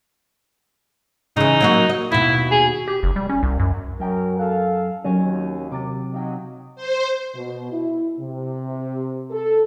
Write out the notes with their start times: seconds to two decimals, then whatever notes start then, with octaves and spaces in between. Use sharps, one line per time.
1.37 C#3 E3 D#4
1.60 F#3 A#3 F#4
1.89 D#5
2.12 D#2 B2 E4
2.51 G#4
2.88 G4
3.03 F1
3.16 G3
3.29 C#4
3.43 C2
3.60 F#2
4.00 F#2 F#3 A#4 E5 G5 D7
4.38 A4 F5 F#6
5.04 D#2 F#3 C4 C#4 C#5
5.72 C3 D6 A6
6.14 F#3 D#4 D#5 F5 G5
6.76 C5
7.34 B2
7.72 E4
8.19 C3
9.30 A4